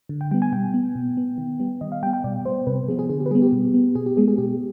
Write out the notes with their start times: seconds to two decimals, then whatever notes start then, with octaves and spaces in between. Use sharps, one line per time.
0.09 D3
0.21 G5
0.31 G3 B3 G5
0.42 G#5
0.52 B2 G5
0.74 B3
0.95 B2
1.17 B3
1.38 D#3
1.60 G3 B3
1.81 D#3 D#5
1.92 F5
2.03 G3 G5
2.06 B3
2.13 G5
2.24 B2 D5
2.45 G3 B3 C5
2.67 C3 B4
2.88 F3 B3 G#4
2.99 G#4
3.09 D3 G#4
3.20 G4
3.26 B4
3.31 G3 B3 G#4
3.42 G4
3.52 B2
3.74 B3
3.95 B2 G#4
4.06 G4
4.17 G#3 B3 G#4
4.28 G#4
4.38 B2 G4